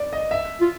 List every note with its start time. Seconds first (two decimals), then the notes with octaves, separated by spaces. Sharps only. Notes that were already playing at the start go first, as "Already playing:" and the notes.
Already playing: D5
0.13 D#5
0.31 E5
0.61 F4